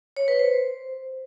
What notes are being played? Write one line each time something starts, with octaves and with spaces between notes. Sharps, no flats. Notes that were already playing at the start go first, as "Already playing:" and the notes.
C#5
B4
C5